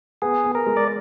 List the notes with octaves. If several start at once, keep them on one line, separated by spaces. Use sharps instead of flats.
B3 G#4
B3
A#4
G#3
D5